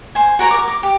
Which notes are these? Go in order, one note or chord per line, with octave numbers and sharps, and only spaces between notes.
C5 G#5
F#4 A#4 C#5 A#5
A#4 D6
D6
G4